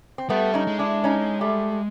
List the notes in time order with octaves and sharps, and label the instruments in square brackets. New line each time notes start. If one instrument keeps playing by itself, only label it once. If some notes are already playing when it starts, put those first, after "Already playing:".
[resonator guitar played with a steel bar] C4
[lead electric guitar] G3 [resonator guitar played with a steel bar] A3 B3
[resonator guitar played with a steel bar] C#4 D#4
[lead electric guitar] G#3
[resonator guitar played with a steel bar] D4 E4
C#4 D#4
G3 A3